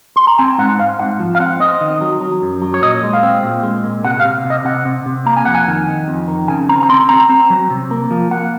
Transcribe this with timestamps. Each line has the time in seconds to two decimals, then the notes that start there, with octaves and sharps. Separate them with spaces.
0.16 C6
0.27 A#5
0.39 C4 G#5
0.58 G#2 F#5
0.79 C4 F5
0.99 G#2 F#5
1.19 F3
1.35 F5
1.40 C4 F#5
1.60 C4 D#5
1.81 D#3
2.01 F#3
2.21 F#3
2.42 F#2
2.62 F#3
2.74 C#5
2.82 A#2 D#5
3.03 G#3
3.13 F5
3.23 C4
3.43 A#2
3.63 G#3
3.84 A#2
4.04 C3 F#5
4.20 F5
4.24 C3
4.45 C3
4.50 D#5
4.65 C3 F#5
4.85 C3
5.06 C3
5.26 A#3 A#5
5.37 G#5
5.45 F2 F#5
5.55 G#5
5.68 D#3
5.87 D#3
6.08 F2
6.28 D#3
6.48 C#3 G#5
6.69 C4 A#5
6.83 A#5
6.89 C4 C6
7.09 C4 A#5
7.29 C4
7.50 F#3
7.70 C3
7.91 A#3
8.11 F3
8.31 A#3 F#5